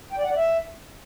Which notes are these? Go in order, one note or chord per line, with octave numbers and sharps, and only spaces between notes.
G5
D5
F#5
D5
E5